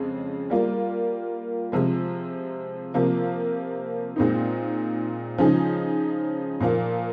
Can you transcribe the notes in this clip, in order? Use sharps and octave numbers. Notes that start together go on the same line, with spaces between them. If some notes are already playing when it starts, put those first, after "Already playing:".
Already playing: F2 C#3 G#3
G3 A#3 F4
C3 F3 G#3
C3 F3 A#3
A#2 G#3 C4 D#4
C#3 F3 G#3 D#4 G#4
A#2 F3 A#3